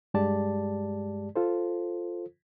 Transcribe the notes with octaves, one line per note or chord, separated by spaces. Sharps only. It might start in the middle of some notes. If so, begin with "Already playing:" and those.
G2 G#3 G4 D5 A5
F4 A4 C5